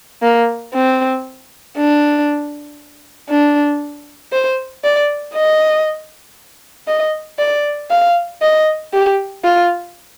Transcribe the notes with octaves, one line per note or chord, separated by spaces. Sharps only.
A#3
C4
D4
D4
C5
D5
D#5
D#5
D5
F5
D#5
G4
F4